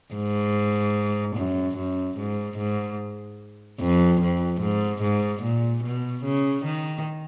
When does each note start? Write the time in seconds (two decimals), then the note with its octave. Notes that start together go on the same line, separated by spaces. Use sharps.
0.15 G#2
1.36 F#2
1.77 F#2
2.17 G#2
2.58 G#2
3.80 F2
4.21 F2
4.61 G#2
5.02 G#2
5.43 A#2
5.84 B2
6.24 C#3
6.65 D#3